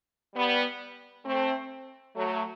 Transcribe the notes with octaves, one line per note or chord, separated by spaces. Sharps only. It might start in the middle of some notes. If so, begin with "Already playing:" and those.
G3 B3
A3 C4
F#3 A3